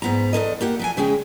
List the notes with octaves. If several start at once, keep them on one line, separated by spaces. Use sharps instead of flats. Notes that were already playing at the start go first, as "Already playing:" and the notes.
G#2 B3 A#5
E2 C3 A4 D#5
A#3 G4 F#5
F3 F#3 G#5
C#3 G#3 G#4 G5